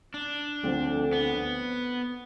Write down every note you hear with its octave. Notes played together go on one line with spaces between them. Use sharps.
D4
D2 D3 F3 A3 C4
B3